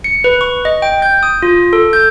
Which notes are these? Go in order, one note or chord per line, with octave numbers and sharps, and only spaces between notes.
C#7
B4
C#6
D#5
G5
G6
D#6
F4
A4
G6